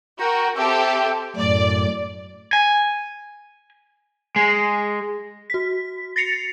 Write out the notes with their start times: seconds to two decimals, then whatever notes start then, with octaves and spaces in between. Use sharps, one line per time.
0.20 F#4 A#4 G5 A#5
0.57 C4 G4 A4 E5 G5
1.36 F#2 A2 D5
2.53 G#5
4.36 G#3
5.50 F#4 B6
6.16 A6 A#6 C7 C#7 F7